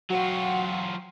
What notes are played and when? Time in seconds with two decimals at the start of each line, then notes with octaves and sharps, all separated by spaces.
0.10 F#3 F4 F#4 F#5 G5